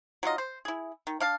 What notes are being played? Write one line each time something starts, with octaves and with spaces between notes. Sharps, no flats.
F#3 D#4 F4 D#5
C5
E4 G#4
D#3
D4 F5 A5